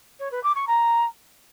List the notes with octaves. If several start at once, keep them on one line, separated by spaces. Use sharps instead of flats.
C#5
B4
D6
C#6
A#5